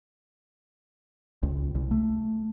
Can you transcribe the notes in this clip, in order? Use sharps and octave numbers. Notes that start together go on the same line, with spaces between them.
C#2
C2
A3